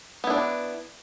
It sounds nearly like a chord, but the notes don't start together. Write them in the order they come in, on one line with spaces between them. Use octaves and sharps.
B3 E4 D4